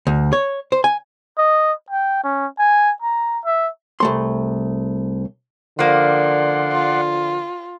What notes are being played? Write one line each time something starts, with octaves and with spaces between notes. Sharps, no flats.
D2
C#5
C5
G#5
D#5
G5
C#4
G#5
A#5
E5
C2 A3 C6
D3 F3 A#3 D5 F#5 C6
F4